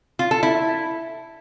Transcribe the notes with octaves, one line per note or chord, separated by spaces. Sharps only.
F4
A4
E4